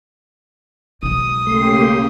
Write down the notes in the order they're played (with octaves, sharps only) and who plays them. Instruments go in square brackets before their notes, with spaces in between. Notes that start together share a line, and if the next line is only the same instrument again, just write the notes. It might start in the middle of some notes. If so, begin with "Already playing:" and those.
[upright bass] B1 G#3 [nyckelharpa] D#6
[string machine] C#3 A#3 G4 [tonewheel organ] A3 C6